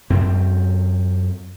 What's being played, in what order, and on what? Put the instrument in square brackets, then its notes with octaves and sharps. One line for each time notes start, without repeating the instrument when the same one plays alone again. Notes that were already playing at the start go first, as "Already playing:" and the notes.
[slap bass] F#2 C4